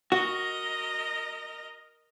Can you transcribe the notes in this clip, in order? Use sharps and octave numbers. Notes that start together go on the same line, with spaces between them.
F#4 A#4 D#5